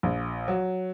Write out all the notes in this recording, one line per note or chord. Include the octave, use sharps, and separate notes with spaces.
A#1
F#3